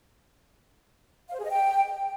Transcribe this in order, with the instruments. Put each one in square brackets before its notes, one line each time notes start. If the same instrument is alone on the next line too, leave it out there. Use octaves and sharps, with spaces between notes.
[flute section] F5
C5
G#4
D#5
G5